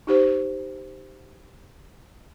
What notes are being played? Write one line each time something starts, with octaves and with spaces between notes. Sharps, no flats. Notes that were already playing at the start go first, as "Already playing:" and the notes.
D#4 G4 C5